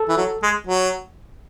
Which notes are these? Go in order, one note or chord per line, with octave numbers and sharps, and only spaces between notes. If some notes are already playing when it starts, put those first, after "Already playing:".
Already playing: A4
E3
F#3
G#3
F#3